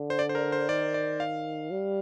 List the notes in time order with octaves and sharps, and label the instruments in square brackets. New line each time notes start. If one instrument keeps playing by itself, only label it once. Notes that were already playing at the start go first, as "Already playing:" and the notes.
Already playing: [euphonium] D3
[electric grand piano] C5
D5
C5
A#4
C5
[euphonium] D#3 [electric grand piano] D5
[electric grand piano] D5
F5
[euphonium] G3